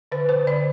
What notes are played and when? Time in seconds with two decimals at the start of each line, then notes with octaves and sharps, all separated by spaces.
0.12 D3 B4
0.29 C5
0.47 D3 D5